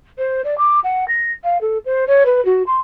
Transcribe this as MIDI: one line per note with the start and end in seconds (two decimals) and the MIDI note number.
0.18 0.41 72
0.44 0.57 74
0.57 0.79 86
0.83 1.05 78
1.08 1.31 94
1.43 1.57 77
1.61 1.78 69
1.85 2.04 72
2.07 2.23 73
2.25 2.43 71
2.45 2.62 66
2.66 2.79 84